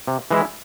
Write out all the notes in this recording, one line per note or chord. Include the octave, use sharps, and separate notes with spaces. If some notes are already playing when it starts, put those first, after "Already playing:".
C3
E3 G#3 E4